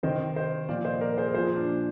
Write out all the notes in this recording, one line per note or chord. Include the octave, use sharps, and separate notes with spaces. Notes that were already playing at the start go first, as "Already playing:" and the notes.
C3 D#3 C5 D#5
C5 D#5
A#2 F3 D5 F5
C5 D#5
A#4 D5
G#4 C5
A#2 F3 G#4 C5
D4